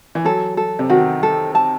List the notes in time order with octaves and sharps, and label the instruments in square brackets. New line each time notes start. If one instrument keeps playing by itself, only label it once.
[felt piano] E3
[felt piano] F#3 [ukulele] A4
[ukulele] A4
[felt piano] C3
[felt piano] D#3 [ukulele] F#4
[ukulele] A4
A5